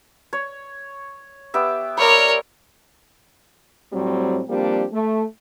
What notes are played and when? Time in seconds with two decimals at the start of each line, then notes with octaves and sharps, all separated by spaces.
0.33 C#5
1.54 B3 G4 E5
1.97 A#3 A#4 C#5 D5 B5
3.93 A2 F#3 G3 C4
4.49 F3 G3 A#3 C4 D4 G4
4.93 A3